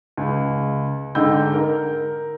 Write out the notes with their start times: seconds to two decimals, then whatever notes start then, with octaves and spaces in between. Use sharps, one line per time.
0.17 C#2
1.15 G#2 D3 D#4 G5 E6 G6
1.53 A#4